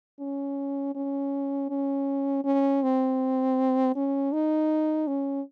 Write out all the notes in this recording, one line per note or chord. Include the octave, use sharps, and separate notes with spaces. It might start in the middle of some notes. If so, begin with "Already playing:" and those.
C#4
C#4
C#4
C#4
C4
C#4
D#4
C#4